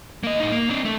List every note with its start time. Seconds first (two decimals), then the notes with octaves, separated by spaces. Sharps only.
0.24 A#3 D#5
0.40 A2 D#4
0.52 A#3
0.70 C4 D4
0.85 A3